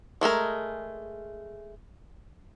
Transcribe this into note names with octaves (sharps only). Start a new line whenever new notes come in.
G#3 A3 G#4 A#4